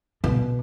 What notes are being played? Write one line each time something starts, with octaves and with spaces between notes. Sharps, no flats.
B2